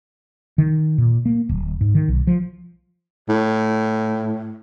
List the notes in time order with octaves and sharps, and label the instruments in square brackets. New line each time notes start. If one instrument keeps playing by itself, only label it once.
[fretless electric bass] D#3
A#2
A#3
D1
G#2
D#3
B1
F3
[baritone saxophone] A2